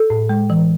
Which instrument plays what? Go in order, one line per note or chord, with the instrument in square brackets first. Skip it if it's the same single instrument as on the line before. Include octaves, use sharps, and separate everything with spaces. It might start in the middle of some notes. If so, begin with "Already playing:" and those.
Already playing: [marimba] A4
A2
G#3
E3